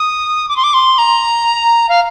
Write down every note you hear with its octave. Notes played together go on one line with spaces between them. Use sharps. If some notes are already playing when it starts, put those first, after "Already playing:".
Already playing: D#6
D6
C6
D6
C6
A#5
F5